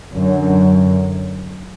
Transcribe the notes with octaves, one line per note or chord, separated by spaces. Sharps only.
F#2 D3 F#3